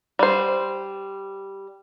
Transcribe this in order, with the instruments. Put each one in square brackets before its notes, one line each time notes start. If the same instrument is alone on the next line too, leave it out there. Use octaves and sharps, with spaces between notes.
[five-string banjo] G3 C5